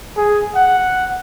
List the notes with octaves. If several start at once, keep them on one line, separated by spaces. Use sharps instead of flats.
G#4
F#5